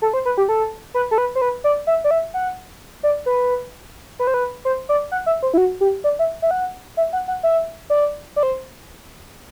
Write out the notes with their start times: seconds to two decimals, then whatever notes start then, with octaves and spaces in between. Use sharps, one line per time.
0.02 A4
0.13 C5
0.25 B4
0.37 G4
0.49 A4
0.94 B4
1.11 A4
1.18 B4
1.35 C5
1.42 B4
1.64 D5
1.87 E5
2.04 D5
2.11 E5
2.34 F#5
3.03 D5
3.26 B4
4.19 B4
4.27 C5
4.34 B4
4.65 C5
4.89 D5
5.12 F#5
5.26 E5
5.43 C5
5.54 E4
5.57 F#4
5.81 G4
6.04 D5
6.19 E5
6.42 E5
6.51 F#5
6.97 E5
7.13 F#5
7.28 F#5
7.43 E5
7.90 D5
8.36 D5
8.43 C5